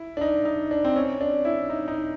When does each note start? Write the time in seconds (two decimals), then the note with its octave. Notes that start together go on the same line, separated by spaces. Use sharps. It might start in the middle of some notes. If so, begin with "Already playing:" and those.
Already playing: E4
0.17 D4
0.21 D#4
0.45 D#4
0.71 D4
0.84 C4
0.96 C#4
1.21 D4
1.45 E4
1.70 D#4
1.88 D#4